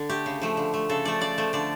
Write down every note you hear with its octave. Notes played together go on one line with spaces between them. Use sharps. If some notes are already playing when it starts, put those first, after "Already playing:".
Already playing: D3
A3 G4
C#3
F3 A3
D3
A3
C#3 A4
F3 A3 D5
C#3 D5
F3 A3
D3 D5